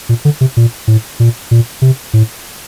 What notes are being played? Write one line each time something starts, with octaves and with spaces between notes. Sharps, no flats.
A#2
D3
C3
A#2
A2
A#2
A#2
C3
A2